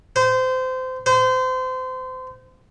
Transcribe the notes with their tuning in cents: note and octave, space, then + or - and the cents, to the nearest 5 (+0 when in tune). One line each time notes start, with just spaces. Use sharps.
C5 -25
C5 -30